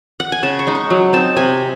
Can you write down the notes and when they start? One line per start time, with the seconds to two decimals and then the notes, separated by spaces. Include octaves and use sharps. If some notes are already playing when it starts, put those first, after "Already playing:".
0.20 F#5
0.32 G#5
0.43 C#3 A5
0.59 C#6
0.67 G#3 D#4
0.75 C#6
0.90 F#3
1.13 C4 D#4 A5
1.37 C3 G#5